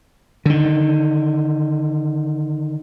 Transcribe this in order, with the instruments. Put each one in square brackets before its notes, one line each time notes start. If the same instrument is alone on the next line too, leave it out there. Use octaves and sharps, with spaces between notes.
[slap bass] D3 D#3